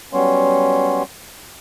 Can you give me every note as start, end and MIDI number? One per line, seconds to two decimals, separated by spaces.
0.13 1.03 54
0.13 1.03 55
0.13 1.03 59
0.13 1.03 61
0.13 1.03 73
0.13 1.03 84